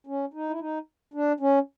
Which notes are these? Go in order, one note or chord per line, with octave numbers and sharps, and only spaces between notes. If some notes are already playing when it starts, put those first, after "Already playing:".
C#4
D#4
E4
D#4
D4
C#4